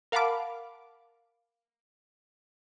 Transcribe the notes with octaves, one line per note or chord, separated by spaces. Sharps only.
A#4 F5 F#5 A5 B5 D6